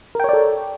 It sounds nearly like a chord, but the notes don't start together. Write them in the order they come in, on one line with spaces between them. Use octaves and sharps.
A#4 G5 C#5 D5 A4